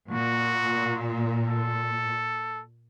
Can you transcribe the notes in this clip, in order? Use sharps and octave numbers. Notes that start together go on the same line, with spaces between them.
A#2 F#4
A4